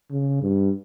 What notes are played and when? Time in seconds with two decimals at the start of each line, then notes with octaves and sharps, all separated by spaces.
0.11 C#3
0.42 G2